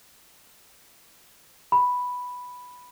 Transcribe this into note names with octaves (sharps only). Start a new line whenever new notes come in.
B5